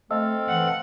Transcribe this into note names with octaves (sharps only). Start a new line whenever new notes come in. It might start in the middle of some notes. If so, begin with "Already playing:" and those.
A3 C4 A4 D#5 F5 E6
E3 F#5